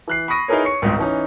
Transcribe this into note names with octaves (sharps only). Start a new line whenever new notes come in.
E3 F#6 C7
B5 C#6 D#6 A#6 D#7
D#4 E4 G#4 A#4 B4 C#5
C#5 C#6 C#7
G#1 C#2 G#2
E3 C#4 D#4